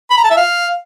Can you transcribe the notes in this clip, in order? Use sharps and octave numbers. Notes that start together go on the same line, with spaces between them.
B5
A#5
A5
E5
F5